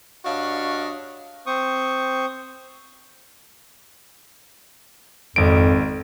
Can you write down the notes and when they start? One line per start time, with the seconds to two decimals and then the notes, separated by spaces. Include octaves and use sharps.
0.25 G2 D4 F#4 C#5 D#5 F5
1.47 C4 C5 C#6 D#6
5.36 G#1 F2 D7